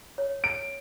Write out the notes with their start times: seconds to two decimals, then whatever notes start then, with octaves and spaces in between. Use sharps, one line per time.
0.18 C#5
0.44 D7